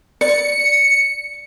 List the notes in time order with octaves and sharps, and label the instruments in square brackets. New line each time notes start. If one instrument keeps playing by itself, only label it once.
[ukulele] D5 [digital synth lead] C#7